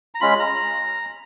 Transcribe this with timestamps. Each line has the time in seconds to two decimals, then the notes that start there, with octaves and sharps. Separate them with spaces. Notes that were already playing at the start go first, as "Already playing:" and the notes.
0.15 A#5
0.21 G#3 C#4 F4 B5
0.39 A#5